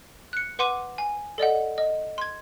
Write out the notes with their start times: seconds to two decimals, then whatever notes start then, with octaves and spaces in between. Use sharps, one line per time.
0.33 F#6 C#7
0.59 B4 F#5 C6 D6 D#7
0.98 G#5
1.38 A4 D5 D#5 F#5
1.78 D#5
2.18 C6 G#6